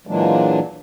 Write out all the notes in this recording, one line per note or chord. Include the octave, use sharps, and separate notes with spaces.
A#2 E3 F#3 G#3 A#3 D4